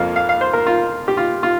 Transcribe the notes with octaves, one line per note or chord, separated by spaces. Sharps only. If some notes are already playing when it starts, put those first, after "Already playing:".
Already playing: F2 F3 A#3 F5
F5
F5
C5
A#4
F4
G4
F4
F4